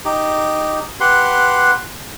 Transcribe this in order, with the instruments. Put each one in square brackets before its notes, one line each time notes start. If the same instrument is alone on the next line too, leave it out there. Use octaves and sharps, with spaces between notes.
[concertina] D#4 G4
G4 B4 F#5 C6